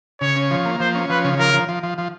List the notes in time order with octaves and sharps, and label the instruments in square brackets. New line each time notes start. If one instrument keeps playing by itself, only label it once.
[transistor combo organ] C#3 [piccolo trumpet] C#5
[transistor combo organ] C#4
F3
A#3
[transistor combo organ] F3 [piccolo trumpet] C5
[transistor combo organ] C#4
[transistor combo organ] F3 [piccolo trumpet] B4
[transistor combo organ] C#3
[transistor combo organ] F3 [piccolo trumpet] A#4
[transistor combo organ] F3
F3
F3
F3